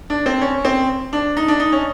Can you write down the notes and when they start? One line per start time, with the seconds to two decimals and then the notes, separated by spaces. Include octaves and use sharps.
0.10 D4
0.26 C4
0.41 C#4
0.65 C4
1.13 D4
1.37 D#4
1.48 D4
1.60 D#4
1.72 C#4